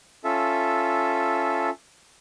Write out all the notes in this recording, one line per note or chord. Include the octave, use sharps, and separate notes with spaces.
C#4 F4 A4 E5